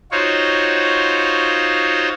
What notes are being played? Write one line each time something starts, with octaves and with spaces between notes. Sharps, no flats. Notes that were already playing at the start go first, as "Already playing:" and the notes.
D#4 F4 F#4 C5 C#5